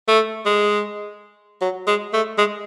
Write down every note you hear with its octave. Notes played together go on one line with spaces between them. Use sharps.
A3
G#3
F#3
G#3
A3
G#3